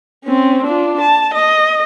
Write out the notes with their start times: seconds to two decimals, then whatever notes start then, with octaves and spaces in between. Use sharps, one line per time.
0.24 C4 C#4
0.65 D4 F4
1.01 A5
1.34 D#5